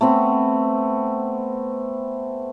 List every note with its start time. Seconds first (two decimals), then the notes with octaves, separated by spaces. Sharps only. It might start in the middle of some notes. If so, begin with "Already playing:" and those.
0.01 A3 B3 C4 B4